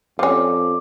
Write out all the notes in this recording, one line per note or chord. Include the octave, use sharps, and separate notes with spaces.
F2 F3 C#4 D5